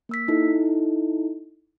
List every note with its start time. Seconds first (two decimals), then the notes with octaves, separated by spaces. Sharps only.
0.09 A#3 E6 B6
0.28 D#4 E4 A4